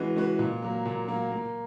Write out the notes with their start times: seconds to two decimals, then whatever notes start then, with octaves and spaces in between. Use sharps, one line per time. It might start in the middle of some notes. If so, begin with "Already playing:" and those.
Already playing: E3 G#3 C#4 F#4 B4
0.16 G#3 C#4 F#4 B4
0.39 A#2
0.62 F#3 A#3
0.86 A#2
1.08 F#3 A#3
1.32 A#3